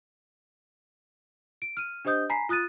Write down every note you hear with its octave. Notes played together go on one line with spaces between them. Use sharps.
D7
F6 D#7
D4 G4 C5 D#5 D#6 G6
G#5 A#5 B5 B6 C7
F4 D#6 F#6 A6 D#7